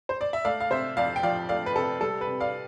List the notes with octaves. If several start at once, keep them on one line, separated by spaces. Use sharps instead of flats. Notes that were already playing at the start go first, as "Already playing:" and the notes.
C5
D5
E5
A3 D5 F5
F5
C3 C5 E5
F2 D5 F5
G5
F3 D5 F5
A3 D5 F5
B4
C3 A4
G3 A4
B4
C3
D5 F5